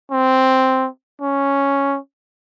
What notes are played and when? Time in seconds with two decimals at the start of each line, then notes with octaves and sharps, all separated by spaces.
0.11 C4
1.21 C#4